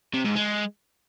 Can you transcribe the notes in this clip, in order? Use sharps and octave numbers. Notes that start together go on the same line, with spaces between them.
C3
G#2
G#3